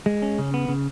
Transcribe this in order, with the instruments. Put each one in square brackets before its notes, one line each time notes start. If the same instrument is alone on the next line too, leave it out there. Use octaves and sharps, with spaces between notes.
[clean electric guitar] G#3
C#4
C#3
B3
C#3